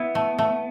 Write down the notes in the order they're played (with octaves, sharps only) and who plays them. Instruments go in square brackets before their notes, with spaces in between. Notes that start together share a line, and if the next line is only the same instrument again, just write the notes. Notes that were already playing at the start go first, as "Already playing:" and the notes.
Already playing: [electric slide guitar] B3 [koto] E4
[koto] A3
A3